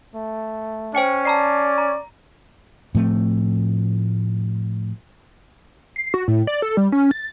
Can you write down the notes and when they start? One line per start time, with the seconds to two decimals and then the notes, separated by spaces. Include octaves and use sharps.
0.15 A3
0.95 C#4 C5 G5 C#7
1.25 D5 A5 A#5 C7
1.78 A#5
2.95 A2 F3 A3 C4
5.96 C7
6.14 F#4
6.28 A2
6.47 D5
6.62 A4
6.77 G3
6.92 C#4
7.11 A6